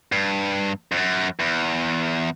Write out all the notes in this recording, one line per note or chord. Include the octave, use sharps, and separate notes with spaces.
G2
F2
F#2
E2